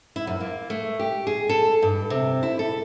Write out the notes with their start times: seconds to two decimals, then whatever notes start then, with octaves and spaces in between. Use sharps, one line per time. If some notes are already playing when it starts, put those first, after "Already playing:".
0.16 E4
0.27 F#2
0.40 A#3
0.70 A3
0.99 G4
1.27 G#4
1.49 A4
1.82 G2
2.10 C3
2.43 E4
2.59 A4